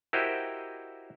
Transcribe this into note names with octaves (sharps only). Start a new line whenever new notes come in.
E4 F#4 G4 A#4 C5 D#5